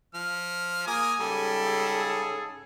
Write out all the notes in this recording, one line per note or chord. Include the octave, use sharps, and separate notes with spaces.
F3 F6
A#3 G#4 G#5 D#6
G#2 C#3 G3 A4
G#4